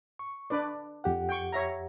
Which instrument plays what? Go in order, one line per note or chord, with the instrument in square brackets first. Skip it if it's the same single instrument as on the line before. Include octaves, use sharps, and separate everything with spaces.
[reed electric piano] C#6
[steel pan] D4 B4 D5
[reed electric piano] F2 G4 F#5
[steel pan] G5 C#6
C#5 E5 A#5